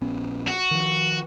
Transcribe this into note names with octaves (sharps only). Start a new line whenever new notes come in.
A#1 B3 C#4
F#4
D#3 F3